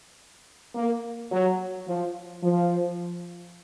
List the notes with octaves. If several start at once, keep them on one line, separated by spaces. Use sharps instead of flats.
A#3
F#3
F3
F3